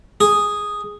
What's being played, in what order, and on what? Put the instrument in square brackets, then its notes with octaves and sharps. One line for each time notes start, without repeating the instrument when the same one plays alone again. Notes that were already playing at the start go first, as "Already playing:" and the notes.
[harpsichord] G#4